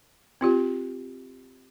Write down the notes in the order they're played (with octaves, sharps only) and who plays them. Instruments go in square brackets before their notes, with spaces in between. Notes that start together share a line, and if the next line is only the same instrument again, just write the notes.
[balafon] C4 F4 G4